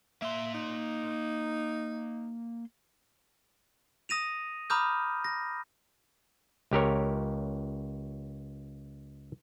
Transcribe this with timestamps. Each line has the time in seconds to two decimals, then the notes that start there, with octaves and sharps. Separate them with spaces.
0.22 A#3 E5 C6
0.54 D#4
4.09 D#6 A#6 D#7 F7
4.70 A#5 B5 D6 D#6 F6 G6
5.24 A#6
6.71 C#2 G4 A#4 C#5